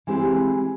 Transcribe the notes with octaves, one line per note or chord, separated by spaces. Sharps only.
E3 G#3 C4 E4 G4